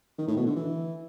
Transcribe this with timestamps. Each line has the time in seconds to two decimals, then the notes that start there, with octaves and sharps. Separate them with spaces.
0.18 D#3
0.28 A2
0.37 B2
0.46 D3
0.56 E3